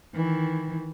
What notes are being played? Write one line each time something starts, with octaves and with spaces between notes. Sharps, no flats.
D#3 E3